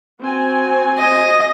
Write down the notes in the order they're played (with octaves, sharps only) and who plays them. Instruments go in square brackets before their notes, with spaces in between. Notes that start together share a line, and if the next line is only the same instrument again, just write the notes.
[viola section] C4 F#4 G#5
[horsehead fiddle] D#5